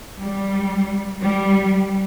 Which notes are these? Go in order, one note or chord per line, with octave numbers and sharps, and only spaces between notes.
G3
G3